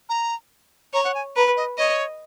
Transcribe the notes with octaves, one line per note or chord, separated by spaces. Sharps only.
A#5
C#5 A#5
F#5
G#5
B4 A#5
D#5
C#5 D#5